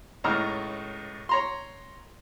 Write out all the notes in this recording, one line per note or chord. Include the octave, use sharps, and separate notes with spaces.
C#2 A2 D#4 A#5 E6 F6
C#5 A#5 C6